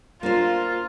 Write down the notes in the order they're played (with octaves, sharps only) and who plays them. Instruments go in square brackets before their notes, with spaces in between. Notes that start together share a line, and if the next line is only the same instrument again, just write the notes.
[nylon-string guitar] A#3 D4 C5 [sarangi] F4